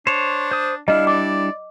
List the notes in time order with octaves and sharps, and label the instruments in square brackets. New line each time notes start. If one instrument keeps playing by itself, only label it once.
[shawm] D4 [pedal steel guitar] C5 C#5
[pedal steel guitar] C5 D#6
[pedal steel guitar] G3 D4 E4 [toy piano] D#5 [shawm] F5
[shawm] D5 [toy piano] D6